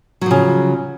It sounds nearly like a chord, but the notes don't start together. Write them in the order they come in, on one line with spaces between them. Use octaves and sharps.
F#3 F3 C#3